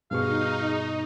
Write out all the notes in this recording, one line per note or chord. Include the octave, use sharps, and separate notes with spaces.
G2 B2 D#4 G#4 F5 C#6